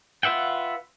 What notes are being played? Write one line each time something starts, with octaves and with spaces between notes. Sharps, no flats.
F4 B4 E5 F#5 G5